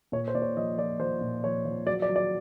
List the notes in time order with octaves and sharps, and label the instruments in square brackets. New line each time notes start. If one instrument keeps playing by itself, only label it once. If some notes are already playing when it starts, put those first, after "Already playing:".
[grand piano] A#2 C#5
C5
A#2 D5
C#5
F3 D#5
F3 D5
F3 C5
A#2
F3 C#5
F3
F#3 D5
D5
F#3
D5